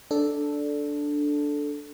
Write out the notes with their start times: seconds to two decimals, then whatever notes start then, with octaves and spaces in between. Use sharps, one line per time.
0.11 D4 A4